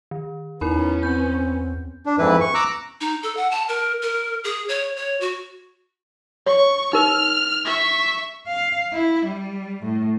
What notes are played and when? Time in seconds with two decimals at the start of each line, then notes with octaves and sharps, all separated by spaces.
0.11 D#3
0.61 E2 B3 C#4 D#4 E4 A#4 B5
1.03 C4 G6
2.06 D4
2.19 F2 G#2 E3 E4 B4
2.41 C#6
2.54 A#5 D6 E6 F#6
3.01 D#4
3.23 A4
3.37 F#5
3.51 A5
3.68 A#4
4.02 A#4
4.44 G#4
4.68 C#5
4.96 C#5
5.21 F#4
6.46 C#5 C#6
6.93 D#4 A#4 F6
7.65 E5 C#6
8.47 F5
8.93 E4
9.26 G3
9.83 A2